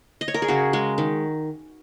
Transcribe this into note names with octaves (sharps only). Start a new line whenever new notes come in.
D#5
C#5
A#4
G#4
C#3 F#4
G#3
D#3